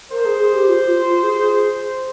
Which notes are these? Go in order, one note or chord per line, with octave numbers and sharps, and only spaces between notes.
A#4 C5
G#4
G#4
G4
F4
G4
F4
F4
G#4
G#4